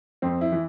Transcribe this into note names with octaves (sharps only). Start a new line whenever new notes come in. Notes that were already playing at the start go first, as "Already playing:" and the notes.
F2 C4
E4
E3